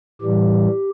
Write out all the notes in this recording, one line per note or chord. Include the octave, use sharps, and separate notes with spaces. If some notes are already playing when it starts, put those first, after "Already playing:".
A2 E3 G3 G4